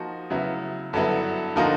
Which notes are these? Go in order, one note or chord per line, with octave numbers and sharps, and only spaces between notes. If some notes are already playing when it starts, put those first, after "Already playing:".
Already playing: F3 A#3 D#4 F#4
C#3 F#3 B3 E4
G2 D3 F#3 B3 E4
D3 F3 A#3 D#4 F#4